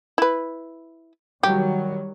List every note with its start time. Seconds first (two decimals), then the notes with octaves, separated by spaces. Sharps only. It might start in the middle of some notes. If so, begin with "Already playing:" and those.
0.18 E4 B4
1.43 D#3 F#3 G3 G4